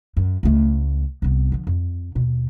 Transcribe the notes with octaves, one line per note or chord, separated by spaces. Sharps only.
F#2
C#2 A3
C2 B3
D3 F3
F2
D#2 B2